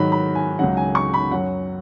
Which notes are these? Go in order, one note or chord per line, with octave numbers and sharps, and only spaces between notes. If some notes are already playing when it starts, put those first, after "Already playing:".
Already playing: G#2 D#3 F#3 B5
B5
G#5
C#2 C#3 F#3 F#5
G#5
C#6
B5
F#2 F#3 F#5